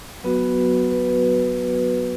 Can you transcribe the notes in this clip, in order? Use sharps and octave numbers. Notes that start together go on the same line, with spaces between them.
F#3 B3 F#4 B4
B4